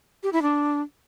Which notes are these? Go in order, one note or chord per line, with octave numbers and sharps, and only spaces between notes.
G4
E4
D4